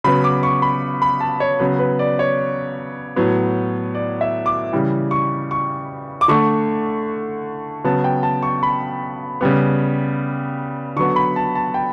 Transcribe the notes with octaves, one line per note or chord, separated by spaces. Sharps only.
C#3 F#3 B3 B5
D6
C#6
B5
B5
A5
C#5
C#3 F#3 B3 B4
B4
D5
C#5
A2 F#3 B3
D5
E5
D6
C#3 E3 G3
C#6
C#6
D6
D3 A3 C#6
C#3 F#3 B3 A5
G5
A5
C#6
B5
C#3 G3 B3
D3 F#3 B3 C#6
B5
A5
A5
G5